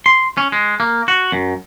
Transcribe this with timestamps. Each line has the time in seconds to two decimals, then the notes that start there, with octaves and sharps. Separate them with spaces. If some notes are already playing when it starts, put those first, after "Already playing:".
0.06 C6
0.37 C#4
0.52 G#3
0.80 A#3
1.08 F#4
1.32 F#2